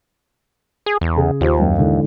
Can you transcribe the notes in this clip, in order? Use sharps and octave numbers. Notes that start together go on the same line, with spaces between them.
G#4
E2
C#3 G#4
D#2 F4 G4 C5
F#1 F#2
G#2 D3 E3